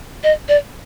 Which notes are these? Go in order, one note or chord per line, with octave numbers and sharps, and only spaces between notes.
D#5
D5